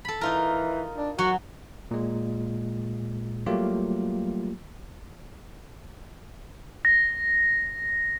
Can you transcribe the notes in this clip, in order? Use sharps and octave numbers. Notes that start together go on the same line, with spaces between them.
A4 B5
E3 D#4 F4 A#4
D4
F#3 F#4
A#2 G#3
F#3 G3 A3 A#3 F4 G4
A#6